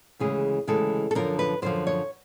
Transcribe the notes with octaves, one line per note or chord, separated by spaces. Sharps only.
D2 C#3 E3 G#3 G#4
D2 C#3 E3 G#3 A4
A4
F#2 D3 F3 A#4
B4
F#2 D3 F3 C5
C#5